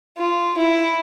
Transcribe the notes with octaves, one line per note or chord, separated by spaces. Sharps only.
F4
E4